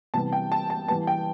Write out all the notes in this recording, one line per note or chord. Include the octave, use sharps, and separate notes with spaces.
C3 E3 G3 B3 A5
G5
A5
A5
E3 G3 B3 A5
G5